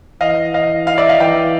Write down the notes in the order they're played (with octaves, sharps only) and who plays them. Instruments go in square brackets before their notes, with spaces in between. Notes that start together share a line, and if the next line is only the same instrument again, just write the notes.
[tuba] E3 [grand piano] D#5 F5
[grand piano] D#5 F5
D#5 F5
D5 E5
D#5 F5
[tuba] E3 [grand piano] F5 G5